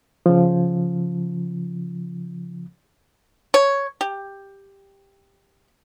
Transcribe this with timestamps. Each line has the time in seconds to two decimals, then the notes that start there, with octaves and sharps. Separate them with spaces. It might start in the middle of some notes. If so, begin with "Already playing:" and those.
0.26 C#3 F3
3.54 C#5
4.01 G4